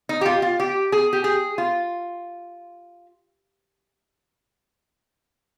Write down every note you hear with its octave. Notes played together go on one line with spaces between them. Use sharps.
D#4
G4
F4
F4
G4
G#4
G4
G#4
F4